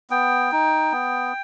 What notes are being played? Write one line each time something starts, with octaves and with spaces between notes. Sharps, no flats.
B3 G5
D#4
B3